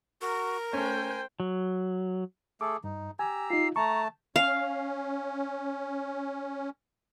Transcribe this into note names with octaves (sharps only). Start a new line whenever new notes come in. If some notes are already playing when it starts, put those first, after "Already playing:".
F#4 A#4
A3 C#4 C5 G5 G#5
F#3
A3 G#4 A4 D6
G2 D#4
G4 G#5 A#5 E6
D#4 F4 C7
A3 A5 A#5 C#6
C#4 F5